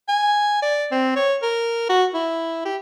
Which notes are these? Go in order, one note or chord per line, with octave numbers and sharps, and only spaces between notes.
G#5
D5
C4
C#5
A#4
F#4
E4
G4